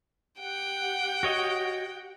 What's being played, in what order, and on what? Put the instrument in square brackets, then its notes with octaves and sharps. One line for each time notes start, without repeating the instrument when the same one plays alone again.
[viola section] G4 F#5 [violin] G5
[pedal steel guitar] F#4 C#5 D#5